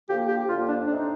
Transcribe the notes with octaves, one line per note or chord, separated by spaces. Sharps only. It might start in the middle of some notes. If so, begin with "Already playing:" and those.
D3 F3 A#3 G4
G4
F2 D3 F3 A#3 F4
D4
A2 A3 C4 D4 D#4